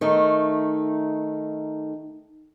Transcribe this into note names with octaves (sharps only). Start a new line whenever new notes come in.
D#3 A3 D#4